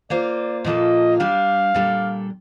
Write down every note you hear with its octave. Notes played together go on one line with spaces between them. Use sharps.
A#3 F4 C5 D5 F5
A#2 F3 A#3 F4 A4 D#5
G3 D4 G4 D5 F5
A#2 G3 D4 A4